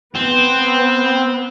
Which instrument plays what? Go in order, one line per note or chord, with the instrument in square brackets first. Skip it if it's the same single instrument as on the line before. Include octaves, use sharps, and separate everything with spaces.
[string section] B3 [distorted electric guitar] C4